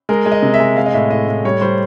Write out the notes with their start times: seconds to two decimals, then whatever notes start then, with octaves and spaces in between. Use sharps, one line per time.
0.09 G#3 A#4
0.26 G#3
0.32 D#5
0.42 C3
0.54 E5
0.60 G#3
0.77 G#3 F5
0.86 D#5
0.93 A2 E5
1.11 A2 D#5
1.28 A2
1.45 G3 C#5
1.61 G3 C5